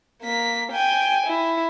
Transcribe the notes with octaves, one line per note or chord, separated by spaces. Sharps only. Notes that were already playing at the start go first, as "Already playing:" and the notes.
A#3 B6
G5 G#5
E4